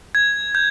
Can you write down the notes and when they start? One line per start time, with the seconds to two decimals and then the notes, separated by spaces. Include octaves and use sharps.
0.15 G#6
0.55 G6